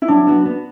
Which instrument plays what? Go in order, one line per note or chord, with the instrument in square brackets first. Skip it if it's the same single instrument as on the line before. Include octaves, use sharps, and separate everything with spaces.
[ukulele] E4
[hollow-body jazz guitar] F#3 [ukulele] D4
[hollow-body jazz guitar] B3 F#4
B3